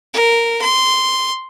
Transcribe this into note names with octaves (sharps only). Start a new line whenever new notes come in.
A#4
C6